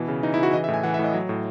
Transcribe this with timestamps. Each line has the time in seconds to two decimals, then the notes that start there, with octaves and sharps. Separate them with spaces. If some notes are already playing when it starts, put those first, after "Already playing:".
Already playing: B2 E3
0.08 C#3
0.23 E3 D#4
0.34 E4
0.38 C#3 F#4
0.53 E3 D#5
0.64 E5
0.68 A2
0.74 G#5
0.83 E3 F#5
0.94 E5
0.99 A2
1.04 D#5
1.13 F#3
1.29 A2